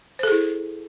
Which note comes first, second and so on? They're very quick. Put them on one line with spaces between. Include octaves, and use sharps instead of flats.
C5 A4 G#4 E4